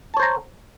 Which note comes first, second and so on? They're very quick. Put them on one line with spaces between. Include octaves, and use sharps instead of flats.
A5 C#5 C5 A#5